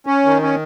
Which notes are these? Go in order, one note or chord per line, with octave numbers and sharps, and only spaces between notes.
C#4
D#3
C#4